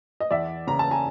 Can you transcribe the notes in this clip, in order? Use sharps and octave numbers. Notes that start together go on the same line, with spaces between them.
D#5
E2 D5 E5
C#3 A#5
A5
G#5 A#5